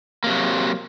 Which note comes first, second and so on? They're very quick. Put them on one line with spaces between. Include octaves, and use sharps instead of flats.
A#3 C3 F#3